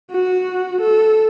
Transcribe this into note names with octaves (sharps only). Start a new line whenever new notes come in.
F#4
A4